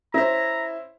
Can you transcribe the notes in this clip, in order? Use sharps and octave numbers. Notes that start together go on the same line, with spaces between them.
C#4 E4 C5 A#5